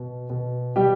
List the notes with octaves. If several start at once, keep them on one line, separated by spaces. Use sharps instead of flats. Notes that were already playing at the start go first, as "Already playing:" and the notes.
Already playing: B2
B2
B2 G3 G4